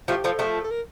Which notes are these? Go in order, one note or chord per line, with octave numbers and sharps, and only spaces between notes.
F3 A3 G4
F3 A3 A4
F3 A3
A4
A#4